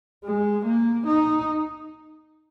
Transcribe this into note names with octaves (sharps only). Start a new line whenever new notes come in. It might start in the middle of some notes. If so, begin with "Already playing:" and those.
G#3
A#3
D#4